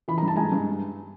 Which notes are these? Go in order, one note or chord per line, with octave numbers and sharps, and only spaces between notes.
E3 B5
A#5
G2
A5
G#3 G#5 A#5
G2